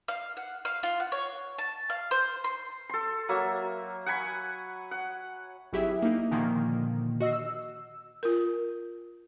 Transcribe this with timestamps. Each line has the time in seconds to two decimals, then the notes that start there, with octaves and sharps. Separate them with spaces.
0.08 F5
0.37 F#5
0.65 F5
0.83 F4
1.00 F#5
1.12 C#5
1.58 A5
1.90 F5
2.11 C5
2.44 C6
2.89 A4 C6
3.29 F#3 A#3 E5
4.06 F#5 G#5 B5 C#6
4.91 F#5
5.73 G#1 F#3 E4 G4 G#4 E5
6.02 A#3 D#4
6.31 A#2 D3 D#3 F3 A#3
7.20 F#4 D#5 E6 C7
7.33 E6
8.23 F4 A#4